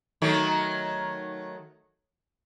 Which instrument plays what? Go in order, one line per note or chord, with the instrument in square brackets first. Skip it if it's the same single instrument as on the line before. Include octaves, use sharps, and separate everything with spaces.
[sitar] D#3 F#3 A3